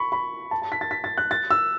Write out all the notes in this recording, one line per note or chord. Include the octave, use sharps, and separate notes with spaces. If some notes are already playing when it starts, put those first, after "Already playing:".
Already playing: B5 C#6
B5
A5
A5
B6
A6
B6
A6
F#6
A6
E6